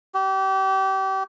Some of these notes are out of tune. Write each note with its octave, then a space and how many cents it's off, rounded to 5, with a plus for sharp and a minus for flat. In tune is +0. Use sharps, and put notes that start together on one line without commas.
G4 -30